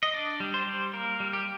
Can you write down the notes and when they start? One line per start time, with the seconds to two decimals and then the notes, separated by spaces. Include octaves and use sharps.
0.03 D#5
0.14 D4 D5
0.40 G3
0.54 C5
0.67 G3
0.93 A#3 A#4
1.20 G3
1.33 G4